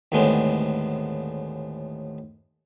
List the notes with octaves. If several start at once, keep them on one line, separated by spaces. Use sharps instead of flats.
D#2 A2 D3 G#3 B3 C4